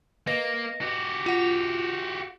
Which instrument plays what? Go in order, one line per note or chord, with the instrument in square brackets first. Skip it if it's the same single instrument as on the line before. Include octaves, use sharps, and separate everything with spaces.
[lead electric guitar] A#3 [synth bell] B4 D#5 A#6
[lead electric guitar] F#4 G4
[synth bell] F4 F#5 F7